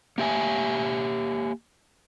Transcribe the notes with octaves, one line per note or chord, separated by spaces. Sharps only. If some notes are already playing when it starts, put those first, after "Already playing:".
A#3 G4 E5 G#5